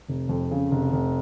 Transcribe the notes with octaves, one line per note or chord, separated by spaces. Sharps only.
F1
F2
C#3
F1
F1